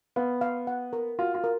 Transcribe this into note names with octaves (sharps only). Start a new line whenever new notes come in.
B3 F5
F5
F#5
A#4
F4 F#4
F4
A#4